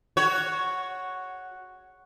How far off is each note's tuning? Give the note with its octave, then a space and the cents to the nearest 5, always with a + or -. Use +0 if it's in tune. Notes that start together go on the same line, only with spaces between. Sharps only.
F#4 +0 C#5 +0